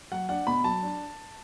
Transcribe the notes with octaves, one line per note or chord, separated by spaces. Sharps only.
F#3 F#5
D4 F#5
B2 B5
F#3 A5
D4